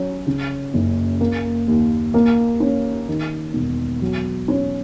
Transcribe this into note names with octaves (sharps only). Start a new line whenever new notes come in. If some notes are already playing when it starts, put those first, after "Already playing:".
Already playing: F#3 C#4
C#3
F#1
A#3
D#2
A#3
C#4
D#3
E1
F#3
C#4